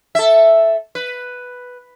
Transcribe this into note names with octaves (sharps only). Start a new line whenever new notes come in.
A4 E5
B4